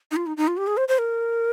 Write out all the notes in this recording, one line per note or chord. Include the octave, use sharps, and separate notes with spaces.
D#4
F4
D#4
D#4
F4
G4
G#4
C5
C5
A#4